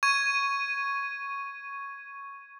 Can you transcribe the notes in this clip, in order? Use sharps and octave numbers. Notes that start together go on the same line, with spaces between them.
C#6 G#6 D#7